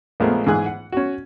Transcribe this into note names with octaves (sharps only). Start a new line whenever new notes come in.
A#1 G#3 A3 B3 A#4 C5
G#2 E3 G#4 F#6
F#5
C#4 F#4